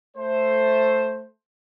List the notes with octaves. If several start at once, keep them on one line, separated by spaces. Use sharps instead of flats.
A3 C5